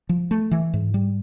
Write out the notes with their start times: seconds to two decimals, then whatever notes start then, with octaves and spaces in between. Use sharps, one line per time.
0.09 F3
0.31 A3
0.51 E3
0.74 G#2
0.94 G3